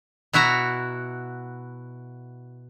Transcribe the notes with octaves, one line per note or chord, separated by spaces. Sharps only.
B2 E4 F#4 E5 A#5